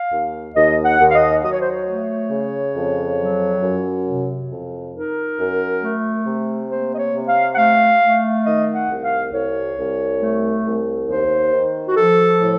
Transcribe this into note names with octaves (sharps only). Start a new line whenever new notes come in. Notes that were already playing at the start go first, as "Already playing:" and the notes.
Already playing: F5
D#2
D#2 D#5
F#5
D#2
F5
D#5
F#3 D#5
C#5
C5
C#5
A3
C#3
F2
F#3
F#2
C3
F2
D#4 A#4
F#2
A3
C3
A#3 C5
D#5
C#5
C3
F5
F#5
A3 F5
A3
D#3 D#5
F#5
C2
F5
C2 C#5
C2
A3
C2
D#2 C5
D#3
F#4
F3 A4
A2